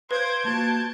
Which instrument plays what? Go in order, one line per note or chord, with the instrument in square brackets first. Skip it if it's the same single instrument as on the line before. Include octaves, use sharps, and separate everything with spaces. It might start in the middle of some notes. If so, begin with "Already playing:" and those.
[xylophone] B4 [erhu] C5 [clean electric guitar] F5 [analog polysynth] G6 G#6 D7
[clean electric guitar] A#3 F#4 [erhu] A5